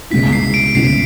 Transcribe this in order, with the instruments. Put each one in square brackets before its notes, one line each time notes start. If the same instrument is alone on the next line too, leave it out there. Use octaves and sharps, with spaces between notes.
[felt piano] C#2 B2 G#3 C#4 E4 [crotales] B6
[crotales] C7
D7
[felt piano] C#2 B2 G#3 C#4 E4 [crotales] C7